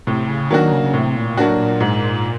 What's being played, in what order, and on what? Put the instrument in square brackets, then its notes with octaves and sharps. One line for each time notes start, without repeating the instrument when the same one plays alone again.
[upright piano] A2 [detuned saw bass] C3
[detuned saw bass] C#3
[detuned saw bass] D#3 [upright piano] F#3 A#3 D4 F#4
[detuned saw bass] C#3
C#3
[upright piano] A2 [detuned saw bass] C3
[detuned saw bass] A#2
[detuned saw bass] A2 [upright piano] F#3 A#3 D4 F#4
[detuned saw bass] A#2
[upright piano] G#2